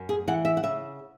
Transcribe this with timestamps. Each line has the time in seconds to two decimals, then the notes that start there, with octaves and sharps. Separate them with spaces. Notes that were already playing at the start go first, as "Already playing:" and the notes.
Already playing: F#2
0.09 G#4
0.27 E3 F#5
0.45 E5
0.57 F#5
0.63 C#3 E5